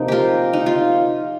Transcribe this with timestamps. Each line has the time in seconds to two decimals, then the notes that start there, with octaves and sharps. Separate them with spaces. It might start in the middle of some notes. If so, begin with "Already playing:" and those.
Already playing: C3 F3 A#3 C4 D#4
0.08 F4 G4 A#4
0.53 D#4
0.66 F4